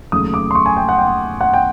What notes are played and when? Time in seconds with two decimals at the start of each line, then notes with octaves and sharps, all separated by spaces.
0.12 D#2 C#3 F#3 A3 D#6
0.34 D6
0.51 C6
0.55 C#6
0.66 G#5
0.77 G5
0.89 F#5
0.98 G5
1.41 F#5
1.54 G5